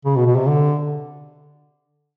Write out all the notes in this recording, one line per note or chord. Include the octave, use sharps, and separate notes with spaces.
C#3
B2
B2
C3
D3